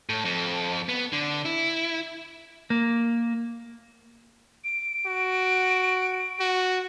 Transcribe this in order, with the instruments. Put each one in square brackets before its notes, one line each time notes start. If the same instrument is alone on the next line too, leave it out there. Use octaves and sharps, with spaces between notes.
[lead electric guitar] A2
F2
B3
D3
E4
[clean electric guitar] A#3
[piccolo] D7
[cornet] F#4
F#4